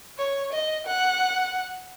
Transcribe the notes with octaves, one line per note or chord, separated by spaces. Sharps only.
C#5
D#5
F#5